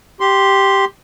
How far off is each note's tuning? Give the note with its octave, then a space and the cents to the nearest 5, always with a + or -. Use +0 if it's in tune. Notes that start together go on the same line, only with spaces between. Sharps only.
G4 +0 C6 +0